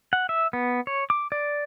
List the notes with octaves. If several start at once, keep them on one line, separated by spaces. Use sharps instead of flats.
F#5
E5
B3
C#5
D6
D5